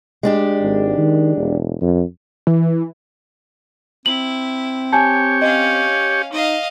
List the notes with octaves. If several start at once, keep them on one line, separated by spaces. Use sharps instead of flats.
G#3 D4 G4
G#1
D#3
E1
F2
E3
C4 E4 F#7
G4 C#5 G#5 A5
C#4 D#5 F5
D#4 D#5 F5